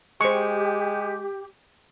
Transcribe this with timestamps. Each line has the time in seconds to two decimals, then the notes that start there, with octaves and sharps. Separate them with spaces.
0.21 G#3 G4 C5 C#6